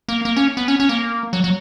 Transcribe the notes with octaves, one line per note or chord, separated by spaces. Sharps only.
A#3
A#3
C#4
B3
C#4
C#4
A#3
F#3
F#3